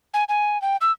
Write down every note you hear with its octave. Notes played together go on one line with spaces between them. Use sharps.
G#5
G#5
G5
E6